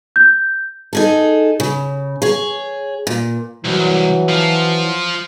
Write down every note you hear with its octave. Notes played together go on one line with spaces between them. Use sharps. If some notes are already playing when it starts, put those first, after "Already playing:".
G6
D#4 G#4 A4
C#3
G#4 C#5
A#2
C2 E3 F#3
F3 F4